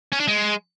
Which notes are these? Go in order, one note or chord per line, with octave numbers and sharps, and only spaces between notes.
C#4
D4
G#3